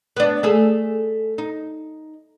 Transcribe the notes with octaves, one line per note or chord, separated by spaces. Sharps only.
B3 D4
A3 G#4 A4
D#4